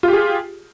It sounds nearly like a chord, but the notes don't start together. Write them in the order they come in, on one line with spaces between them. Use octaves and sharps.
F4 G4 G#4